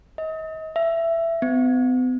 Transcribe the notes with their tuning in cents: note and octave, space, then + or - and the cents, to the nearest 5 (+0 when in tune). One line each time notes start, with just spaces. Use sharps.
D#5 +35
E5 +15
B3 +45